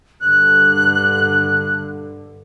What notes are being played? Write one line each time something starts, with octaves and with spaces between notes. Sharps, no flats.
G2 D3 F#6